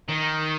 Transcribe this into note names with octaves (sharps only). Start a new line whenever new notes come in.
D#3